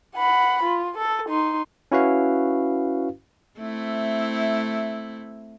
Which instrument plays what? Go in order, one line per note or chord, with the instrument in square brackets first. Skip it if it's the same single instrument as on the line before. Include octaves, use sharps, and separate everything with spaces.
[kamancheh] F#5 B5
F4
A4
D#4 C6
[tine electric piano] C#4 E4 F#4 B4 F5
[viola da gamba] A3 C4 E4